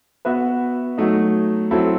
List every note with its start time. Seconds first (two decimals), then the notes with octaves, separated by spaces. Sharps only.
0.25 B3 F#4 B4 E5
0.98 F#3 A3 D#4
1.71 F#3 C4 E4 A4